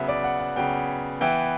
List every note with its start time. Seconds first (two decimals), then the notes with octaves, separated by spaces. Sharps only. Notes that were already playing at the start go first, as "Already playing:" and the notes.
Already playing: C#3 F#3 B3 E5
0.08 D5
0.24 F#5
0.40 F#5
0.56 C#3 F#3 B3 G5
1.21 E3 B3 E4 G5